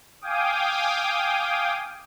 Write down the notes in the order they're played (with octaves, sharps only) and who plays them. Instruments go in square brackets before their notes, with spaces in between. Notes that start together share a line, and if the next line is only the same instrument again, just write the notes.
[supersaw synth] F5 G5 G#5 D6 D#6